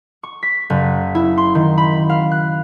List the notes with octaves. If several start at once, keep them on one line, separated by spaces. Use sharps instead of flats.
C#6
B6
F#1
E4
C6
D#3
B5
F5
F#6